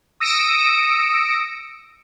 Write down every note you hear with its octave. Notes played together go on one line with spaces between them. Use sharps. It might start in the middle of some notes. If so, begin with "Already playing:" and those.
D#6 E6 A#6 C#7 D7